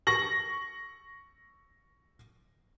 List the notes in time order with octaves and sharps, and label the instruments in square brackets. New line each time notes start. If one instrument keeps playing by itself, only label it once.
[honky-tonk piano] C#6 A#6 F#7